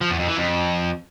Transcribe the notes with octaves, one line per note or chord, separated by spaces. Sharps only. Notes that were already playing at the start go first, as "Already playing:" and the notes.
F3
E2
F2
E3
F2